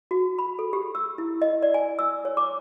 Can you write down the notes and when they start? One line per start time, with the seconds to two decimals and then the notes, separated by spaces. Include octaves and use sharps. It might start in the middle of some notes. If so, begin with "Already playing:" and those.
0.11 F#4
0.39 B5
0.59 A4
0.73 G4
0.95 E6
1.18 E4
1.42 D#5
1.63 D5
1.74 G#5
1.99 E6
2.25 C#5
2.37 D6